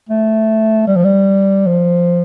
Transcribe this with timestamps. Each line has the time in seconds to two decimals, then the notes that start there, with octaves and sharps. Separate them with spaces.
0.09 A3
0.87 G3
0.96 F3
1.05 G3
1.66 F3